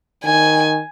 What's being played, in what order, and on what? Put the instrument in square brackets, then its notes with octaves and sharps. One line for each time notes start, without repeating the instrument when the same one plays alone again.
[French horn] D#3 [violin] G#5